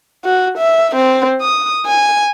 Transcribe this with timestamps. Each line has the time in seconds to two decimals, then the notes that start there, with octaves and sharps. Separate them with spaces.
0.25 F#4
0.58 E5
0.96 C4
1.41 D#6
1.86 G#5